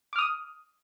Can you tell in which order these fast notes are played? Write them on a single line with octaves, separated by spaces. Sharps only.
D6 F6 D#6